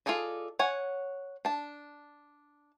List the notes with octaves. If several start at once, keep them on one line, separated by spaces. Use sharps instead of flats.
F4 G#4 A4 D5 D#5
C#5 F#5 G#5
D4 A5